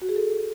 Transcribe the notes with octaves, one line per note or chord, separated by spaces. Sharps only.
F#4
G#4
A4